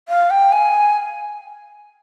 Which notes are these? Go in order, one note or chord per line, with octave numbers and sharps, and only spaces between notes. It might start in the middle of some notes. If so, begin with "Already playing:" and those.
F5
G5
G#5